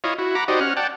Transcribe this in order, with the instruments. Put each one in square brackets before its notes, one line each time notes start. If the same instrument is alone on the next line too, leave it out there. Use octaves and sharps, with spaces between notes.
[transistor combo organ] E4 F4 C#5 D#5
E4 F#4
F#5 A#5 B5 D6
D#4 F#4 G4 C5 D5 D#5
C#4 F#5 F6
D5 F#5 G5 A5